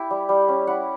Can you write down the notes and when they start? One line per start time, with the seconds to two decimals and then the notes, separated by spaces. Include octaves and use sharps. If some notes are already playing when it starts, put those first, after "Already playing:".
Already playing: E4 G4
0.11 G3
0.29 G3
0.48 C#4
0.67 E4 F#5